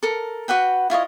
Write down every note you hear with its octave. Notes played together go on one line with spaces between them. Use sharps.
A4 A#4
F#4 B4 F#5 G5
E4 F4 C#5 D#5